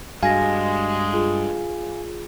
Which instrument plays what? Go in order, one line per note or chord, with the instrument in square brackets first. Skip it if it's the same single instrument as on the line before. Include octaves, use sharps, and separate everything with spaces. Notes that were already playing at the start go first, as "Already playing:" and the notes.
[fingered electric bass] G2 [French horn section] G#3 [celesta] F#4 A#6 [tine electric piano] F5 G#5
[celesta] F4 G#4